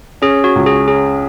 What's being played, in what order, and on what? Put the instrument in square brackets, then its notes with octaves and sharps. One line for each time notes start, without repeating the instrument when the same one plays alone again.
[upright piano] C#4 [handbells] G#4
[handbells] F#4
[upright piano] C#2
[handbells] G#4
[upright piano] C#4 [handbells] G#4